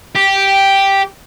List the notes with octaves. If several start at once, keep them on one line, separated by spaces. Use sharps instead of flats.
G4